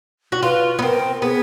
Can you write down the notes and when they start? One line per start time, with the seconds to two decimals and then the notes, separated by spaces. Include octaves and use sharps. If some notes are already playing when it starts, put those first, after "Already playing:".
0.32 F#4
0.43 F4 B4
0.79 B3
0.82 C4 A#4
1.22 B3 G#4